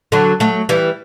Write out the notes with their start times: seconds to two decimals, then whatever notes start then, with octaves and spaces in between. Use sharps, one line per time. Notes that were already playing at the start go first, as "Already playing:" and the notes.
0.12 D3 F#3
0.40 F#3 A3
0.69 E3 G3